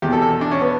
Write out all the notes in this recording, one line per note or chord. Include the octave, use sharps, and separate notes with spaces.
E2 G4
B2 A4
A4
D4
C#4
B3